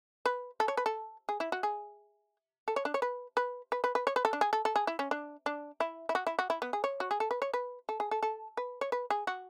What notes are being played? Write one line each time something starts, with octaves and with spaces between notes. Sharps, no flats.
B4
A4
C#5
B4
A4
G#4
E4
F#4
G#4
A4
C#5
D4
C#5
B4
B4
B4
B4
B4
C#5
B4
A4
D4
G#4
A4
A4
G#4
E4
C#4
D4
D4
E4
E4
F#4
E4
F#4
E4
B3
G#4
C#5
F#4
G#4
A4
B4
C#5
B4
A4
G#4
A4
A4
B4
C#5
B4
G#4
F#4